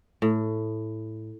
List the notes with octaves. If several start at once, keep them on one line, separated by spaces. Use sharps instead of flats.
A2